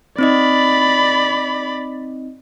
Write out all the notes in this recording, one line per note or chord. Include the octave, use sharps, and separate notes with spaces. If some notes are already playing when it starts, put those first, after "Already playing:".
C4 D#4 D5 D#5 B5